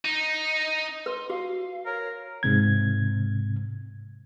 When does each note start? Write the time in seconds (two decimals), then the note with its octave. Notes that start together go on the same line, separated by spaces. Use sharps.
0.05 D#4
1.06 B4 C6
1.30 F#4 F5
1.86 A#4 C#5
2.43 G#2 C3 G#6